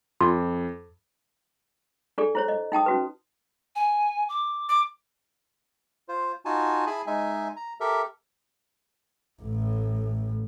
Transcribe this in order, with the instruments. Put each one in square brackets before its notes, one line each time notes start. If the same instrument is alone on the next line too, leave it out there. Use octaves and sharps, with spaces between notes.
[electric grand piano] F2 [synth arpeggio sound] F4
[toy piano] D4 G4 A4 D5
E4 C5 C#5
D#5
D#4 G5 A5 D#6
C#4 F#4 B4
[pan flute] G#5
D6
[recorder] D6
[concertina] F4 C5
D#4 F4 F#4 G#5 A5
E4 G#4 G#5 A5 B5
G#3 D#4 E5 G#5
A#5
G4 A4 A#4 E5
[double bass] A1 A2